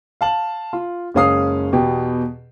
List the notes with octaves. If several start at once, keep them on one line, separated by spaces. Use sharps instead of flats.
F5 A5 F#7
F4
F#1 G#3 C#4 F5 D#6 C7
E2 B2 G4